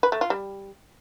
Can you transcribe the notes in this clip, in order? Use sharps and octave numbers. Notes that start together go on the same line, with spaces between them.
B4
A3
F4
G3